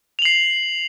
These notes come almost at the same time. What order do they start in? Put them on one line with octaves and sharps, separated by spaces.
F7 F#7 C7